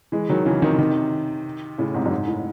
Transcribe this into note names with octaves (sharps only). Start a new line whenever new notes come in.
E3 G#3
D#3 F#3
C#3 E3
C3 D#3
C3 D#3
A2 C#3
G#2 C3
F#2
G#2
A2